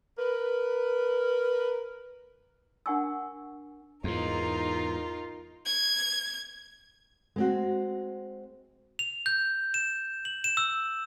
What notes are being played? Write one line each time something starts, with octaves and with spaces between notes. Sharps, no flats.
A#4 B4
D4 A#4 F#5 G#5 C#6 E6
E2 G#2 D#4 F4 A#4
G#6
G#3 C4 F#4
F7
G6
E7
F#7
E7
E6